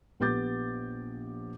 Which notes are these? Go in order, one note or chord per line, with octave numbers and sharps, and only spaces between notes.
A#1 B3 G4 D6 G6 A6